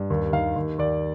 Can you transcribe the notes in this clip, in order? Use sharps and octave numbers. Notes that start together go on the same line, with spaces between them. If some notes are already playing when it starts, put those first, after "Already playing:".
Already playing: G2
D#2
D#3 F5
D#2
D#2 D5